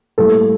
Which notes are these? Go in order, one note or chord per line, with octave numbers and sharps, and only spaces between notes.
A2 G3 A#3 A4